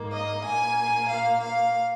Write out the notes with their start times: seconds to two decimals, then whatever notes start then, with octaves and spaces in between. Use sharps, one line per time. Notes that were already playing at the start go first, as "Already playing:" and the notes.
Already playing: G#2 D#3 A#3
0.12 D#5
0.44 A#2 A#3 G#5
1.08 F5
1.40 F5